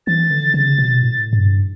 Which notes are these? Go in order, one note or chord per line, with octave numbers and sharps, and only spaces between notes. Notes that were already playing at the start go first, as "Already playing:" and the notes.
E3 A6
D3
C#3
B2
A2
G2